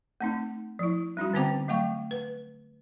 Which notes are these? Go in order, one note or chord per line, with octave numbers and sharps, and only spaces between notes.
A3 C4 D#4
F3 E4
G3 C#4 D#4 F#4
D3 B3 C4 C5 G5 D6
F#3 A3 F5 G5 C#6
B4